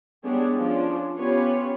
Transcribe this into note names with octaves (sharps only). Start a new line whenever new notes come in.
G3 G#3 B3 D4 G#4 C#5
F3 C#4 D4
B3 C#4 F4 G4 B4 C#5